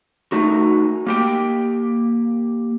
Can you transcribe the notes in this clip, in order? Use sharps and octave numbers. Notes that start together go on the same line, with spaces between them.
A3 D#4 F#4
A#3 G4 G5